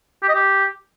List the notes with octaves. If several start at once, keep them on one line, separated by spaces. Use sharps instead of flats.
G4
D#5
G4